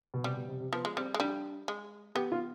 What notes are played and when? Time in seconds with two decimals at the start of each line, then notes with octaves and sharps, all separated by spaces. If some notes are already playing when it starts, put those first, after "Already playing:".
0.14 B2
0.24 C3 G3
0.37 B2
0.48 C3
0.60 C3
0.73 F3 B3
0.85 G#3
0.96 G3 C4
1.14 G#3
1.20 G3 D4
1.68 G#3
2.15 B3 G4
2.32 F4